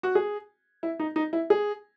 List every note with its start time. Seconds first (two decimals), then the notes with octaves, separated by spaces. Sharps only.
0.03 F#4
0.15 G#4
0.83 E4
1.00 D#4
1.16 D#4
1.33 E4
1.50 G#4